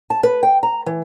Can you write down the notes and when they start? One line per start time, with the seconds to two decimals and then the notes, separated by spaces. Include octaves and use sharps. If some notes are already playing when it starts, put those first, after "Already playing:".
0.10 A5
0.23 B4
0.43 G5
0.63 A#5
0.86 E3